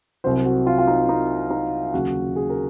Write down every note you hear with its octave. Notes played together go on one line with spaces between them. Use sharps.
C2 C3 F#3 C5
F#4
F4
F4
D#4
D#4
D#4
D#2 C#3 F#3 F#4
G#4
A#4